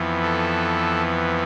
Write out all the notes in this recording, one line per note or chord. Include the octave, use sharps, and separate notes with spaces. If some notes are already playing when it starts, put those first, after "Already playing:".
Already playing: F2 E3 B3
A4